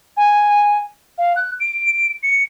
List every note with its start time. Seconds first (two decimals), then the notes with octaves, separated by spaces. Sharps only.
0.17 G#5
1.18 F5
1.36 F#6
1.60 D7
2.23 C#7